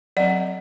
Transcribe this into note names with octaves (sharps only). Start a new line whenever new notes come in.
F#3 C4 D5 F#5